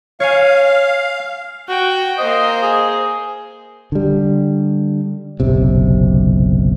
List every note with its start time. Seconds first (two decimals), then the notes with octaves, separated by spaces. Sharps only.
0.20 C#5 F5 G#5
1.69 F#4 G5
2.18 A#3 C5 D#5
2.63 G#4
3.92 D3 G3
5.40 F#1 B1 C3